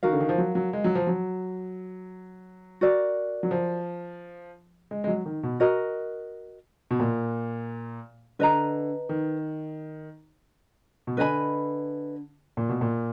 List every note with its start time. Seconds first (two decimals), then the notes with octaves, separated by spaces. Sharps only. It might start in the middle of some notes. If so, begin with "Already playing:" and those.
0.03 D#3 F#4 A#4 F5
0.13 D3
0.20 D#3
0.29 F3
0.38 F#3
0.55 F#3
0.73 G#3
0.84 F#3
0.95 F3
1.07 F#3
2.81 F#4 A#4 D5
3.43 F#3
3.51 F3
4.91 G#3
5.04 G#3
5.08 F#3
5.26 D#3
5.43 B2
5.60 F#4 A#4 D#5
6.91 B2
7.00 A#2
8.39 D3 B4 D#5 A#5
9.09 D#3
11.07 B2
11.17 D3 B4 D#5 G#5 B5
12.57 A#2
12.69 B2
12.81 A#2